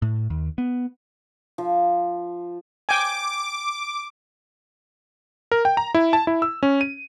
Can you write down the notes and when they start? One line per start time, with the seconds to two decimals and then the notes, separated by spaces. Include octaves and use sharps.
0.02 A2
0.30 D#2
0.58 B3
1.58 F3
2.89 G5 G#5 D6
5.52 A#4
5.65 G5
5.77 A#5
5.94 E4
6.13 A5
6.27 E4
6.42 E6
6.63 C#4
6.81 D#7